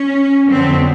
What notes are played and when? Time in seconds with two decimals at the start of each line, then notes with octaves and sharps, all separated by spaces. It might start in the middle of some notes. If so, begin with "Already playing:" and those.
Already playing: C#4
0.48 F2 D3 F#3 B3 C4